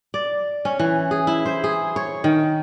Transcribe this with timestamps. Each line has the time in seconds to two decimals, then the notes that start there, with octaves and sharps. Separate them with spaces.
0.14 D5
0.65 C#4
0.79 E3
1.11 G#4
1.27 E4
1.46 C5
1.64 G#4
1.96 C#5
2.24 D#3